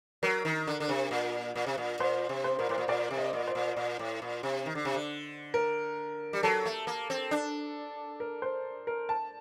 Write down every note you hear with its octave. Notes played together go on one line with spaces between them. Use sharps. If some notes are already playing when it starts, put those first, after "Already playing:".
F#3 A#4
D#3
D3
D3
C3
A#2
A#2
C3
A#2
A#2 C5
C3
C5
A#2 A#4
A2 C5
A#2
A#2 D5
C3
D#5
A#2
C5
A#2
A#2
A2
A#2
C3
D#3
D3
C3
D3
A#4
G3
F#3 A4
A3
A#3
C4
D4
A#4
C5
A#4
A5